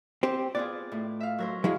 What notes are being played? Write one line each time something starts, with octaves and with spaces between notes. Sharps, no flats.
C4 G4 C5
B3 F4 G#4 D5
A2
E5 F5
F#3 A#4 C5
F#3 G#3 E4 F5